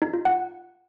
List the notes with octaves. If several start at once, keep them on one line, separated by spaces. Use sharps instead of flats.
D#4
F4
F#5